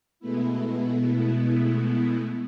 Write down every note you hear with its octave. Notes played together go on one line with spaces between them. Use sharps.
B2 G#3 A3 B3 E4